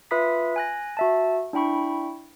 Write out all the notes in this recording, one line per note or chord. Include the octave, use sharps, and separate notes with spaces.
F4 B4 E5 B5 D#6 B6
G#5 F#6 A#6
F#4 E5 A5
D4 E4 G5 B5 C#6